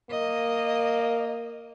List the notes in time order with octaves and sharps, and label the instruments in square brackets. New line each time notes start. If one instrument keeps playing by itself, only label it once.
[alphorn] A#3 [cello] D#5